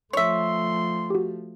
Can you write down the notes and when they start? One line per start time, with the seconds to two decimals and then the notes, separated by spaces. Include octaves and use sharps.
0.13 F3 A3 C#5 E5 C6
1.10 F#4 G4